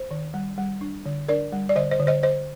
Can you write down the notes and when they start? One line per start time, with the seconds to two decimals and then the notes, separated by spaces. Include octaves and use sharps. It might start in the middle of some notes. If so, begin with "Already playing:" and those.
Already playing: C5
0.11 D#3
0.34 G3
0.58 G3
0.81 D4
1.06 D3
1.28 D4 A#4 D5
1.52 G3
1.69 D5
1.76 D3 C5 D#5
1.91 C5 D#5
2.00 D3
2.07 C5 D#5
2.23 D3 C5 D#5